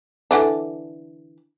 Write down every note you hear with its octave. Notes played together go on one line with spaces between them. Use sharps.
D3 E3 D4